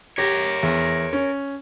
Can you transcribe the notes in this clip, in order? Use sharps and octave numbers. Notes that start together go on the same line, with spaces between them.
G4 A#4 C#5
E2
C#4